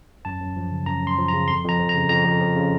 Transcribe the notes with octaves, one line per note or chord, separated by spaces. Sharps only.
F#2 A5
F#2
F3
C#3
F#2 A#5
F#2
C6
F3
A#5
C#3
F2 C6
F2 A#5
F3
A#5
C#3
F2 A#5
F2
F3
C#3